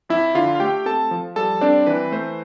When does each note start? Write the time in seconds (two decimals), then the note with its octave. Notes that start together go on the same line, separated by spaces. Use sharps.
0.09 F2 E4 E5
0.35 D3 F4 F5
0.55 F5
0.60 A3 G4 G5
0.86 C4 A4 A5
1.11 F3
1.36 G3 A4 A5
1.61 C4 D4 D5
1.87 E3 B4
2.12 A3 C5